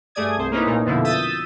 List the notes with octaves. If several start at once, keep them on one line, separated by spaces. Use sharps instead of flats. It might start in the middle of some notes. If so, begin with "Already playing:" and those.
G2 A3 G#4 D5 D#6 G#6
C2 C5
A#3 C#4 D#4 E4 B4
A#2 A3 A#3 D#4
F2 B2 D3 F3 E4
D#6 E6 G6 A6 B6 D#7